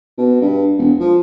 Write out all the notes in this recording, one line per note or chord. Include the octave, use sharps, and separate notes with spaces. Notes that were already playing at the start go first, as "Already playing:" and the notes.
B2
G2
E1
F3